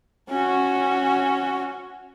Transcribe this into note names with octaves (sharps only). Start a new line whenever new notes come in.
C#4 F#4